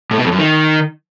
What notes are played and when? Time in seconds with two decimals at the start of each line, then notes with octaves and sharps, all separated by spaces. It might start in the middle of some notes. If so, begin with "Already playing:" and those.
0.11 A2
0.18 B2
0.25 F2
0.32 F#2
0.39 D#3